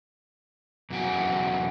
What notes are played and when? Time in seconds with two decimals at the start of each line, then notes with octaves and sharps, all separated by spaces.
0.90 E2 C#3 F#3 F#4 G5 G#5